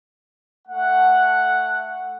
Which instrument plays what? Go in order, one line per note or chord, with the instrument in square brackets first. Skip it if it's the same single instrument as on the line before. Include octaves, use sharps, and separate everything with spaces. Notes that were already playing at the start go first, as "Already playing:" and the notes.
[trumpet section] A3 F#5